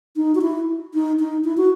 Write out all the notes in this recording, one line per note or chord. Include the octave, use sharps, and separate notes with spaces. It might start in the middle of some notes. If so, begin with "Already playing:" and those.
D#4
F#4
E4
D#4
D#4
E4
F#4